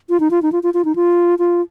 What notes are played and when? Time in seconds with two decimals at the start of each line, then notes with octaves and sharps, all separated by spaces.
0.10 F4
0.20 D#4
0.31 F4
0.42 D#4
0.52 F4
0.63 F4
0.74 F4
0.85 D#4
0.96 F4
1.39 F4